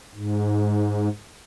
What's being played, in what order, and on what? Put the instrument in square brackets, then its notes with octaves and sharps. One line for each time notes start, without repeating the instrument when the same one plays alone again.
[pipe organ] G#2